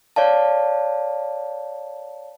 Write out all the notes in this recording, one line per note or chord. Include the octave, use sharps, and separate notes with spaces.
C#5 D5 F5 A5